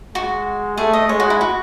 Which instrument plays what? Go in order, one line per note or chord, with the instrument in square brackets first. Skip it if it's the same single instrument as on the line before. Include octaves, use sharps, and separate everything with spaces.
[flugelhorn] G#3 [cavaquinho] F#4
[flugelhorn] A3 [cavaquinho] G#4
[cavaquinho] D#5
[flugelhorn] G#3 [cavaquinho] C#5
[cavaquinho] F#4
E4
F#4